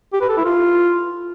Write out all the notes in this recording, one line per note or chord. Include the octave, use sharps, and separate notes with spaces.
G4
B4
A4
E4
F4